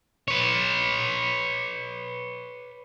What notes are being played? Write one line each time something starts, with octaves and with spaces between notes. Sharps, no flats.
B4 C#5